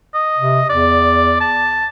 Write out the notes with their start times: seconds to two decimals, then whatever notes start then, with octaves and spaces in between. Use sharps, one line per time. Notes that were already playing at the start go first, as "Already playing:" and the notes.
0.14 D#5
0.38 C3
0.69 E2 D5
1.41 A5